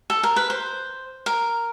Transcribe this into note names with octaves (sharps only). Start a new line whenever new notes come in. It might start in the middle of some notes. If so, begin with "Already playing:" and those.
A4
A#4
B4
C5
A#4